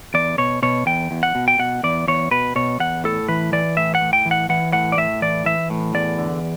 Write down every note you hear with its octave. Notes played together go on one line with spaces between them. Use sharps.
E2 D5
B2 C#5
B2 C#5
E2 G5
E2
F#5
B2
G5
B2 F#5
E2 D5
E2 C#5
B2 B4
B2 C#5
E2 F#5
A2 A4
E3 B4
E3 D5
A2 E5
F#5
A2
G5
E3
F#5
E3 F#5
A2 F#5
D5
A2 E5
E3 D5
E3 E5
A2
E2 D5
D3